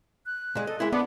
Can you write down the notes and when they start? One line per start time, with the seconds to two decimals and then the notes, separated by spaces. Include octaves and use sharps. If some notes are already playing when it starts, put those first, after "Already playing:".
0.26 F#6
0.55 A#2 G#3
0.67 A4 D#5
0.80 G#3 A#3 E4 E5
0.92 B3 D4 D6